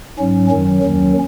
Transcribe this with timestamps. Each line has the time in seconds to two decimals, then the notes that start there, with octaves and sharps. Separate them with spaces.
0.18 G#2 F#3 C#4
0.50 F#2 D#3 F#3 C#4
0.82 D#2 D#3 F#3